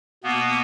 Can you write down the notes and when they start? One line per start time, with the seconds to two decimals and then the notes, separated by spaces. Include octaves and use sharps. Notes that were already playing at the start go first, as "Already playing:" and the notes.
0.24 B2 A#3 B3